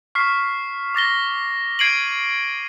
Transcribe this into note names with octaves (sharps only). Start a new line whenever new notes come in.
C#6 F6 B6 C7
D6 A6 A#6 G7
G#6 C7 D7 D#7 F#7